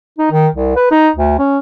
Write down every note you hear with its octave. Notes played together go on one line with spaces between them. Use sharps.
D#4
D#3
C2
B4
D#4
D2
C#4